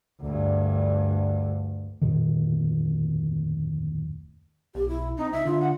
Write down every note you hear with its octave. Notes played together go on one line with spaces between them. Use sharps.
D2 G2
D1 F2 A#2 D#3
B1 G4
E4
C4 D#4
C#2 D#4 E5
D3 F4
F#5